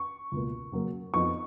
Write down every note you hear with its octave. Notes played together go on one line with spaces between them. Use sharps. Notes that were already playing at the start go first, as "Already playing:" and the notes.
Already playing: C#6
C#2 B2 A#3
C#3 F#3 A#3
F2 F3 B3 D#4 C#6